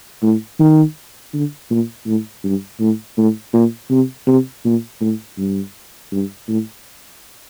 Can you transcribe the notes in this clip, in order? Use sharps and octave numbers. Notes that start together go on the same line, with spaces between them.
A2
D#3
D3
A#2
A2
G2
A2
A2
A#2
C3
C3
A#2
A2
G2
G2
A2